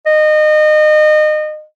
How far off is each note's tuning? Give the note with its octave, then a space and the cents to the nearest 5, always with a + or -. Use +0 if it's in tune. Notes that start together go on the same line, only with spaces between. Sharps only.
D#5 -30